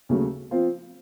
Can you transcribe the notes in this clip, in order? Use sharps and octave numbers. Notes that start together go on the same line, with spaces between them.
D#2 C#3 F#3 A3
F3 C4 F4 C5